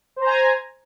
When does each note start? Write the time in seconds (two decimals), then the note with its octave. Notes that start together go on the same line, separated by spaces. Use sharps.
0.16 C5
0.21 A#5
0.26 G#5